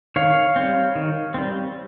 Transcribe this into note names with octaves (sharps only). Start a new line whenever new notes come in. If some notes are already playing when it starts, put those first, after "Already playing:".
D#3 C#5 F5
G3 C4
D#3
G3 C4